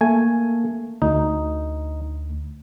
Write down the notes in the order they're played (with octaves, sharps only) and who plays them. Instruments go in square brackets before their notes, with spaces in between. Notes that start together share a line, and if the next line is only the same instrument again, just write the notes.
[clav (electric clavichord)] A3 G#5 [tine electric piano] A#3
[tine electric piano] D2 [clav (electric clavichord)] D#4